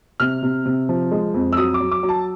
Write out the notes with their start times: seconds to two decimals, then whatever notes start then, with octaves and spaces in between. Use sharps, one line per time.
0.20 C3 F6
0.43 C3
0.66 C3
0.89 F3
1.11 G#3
1.34 F2
1.53 E6
1.57 F#3 D#6
1.74 D6
1.80 F#3
1.91 D6
2.03 F#3
2.09 A5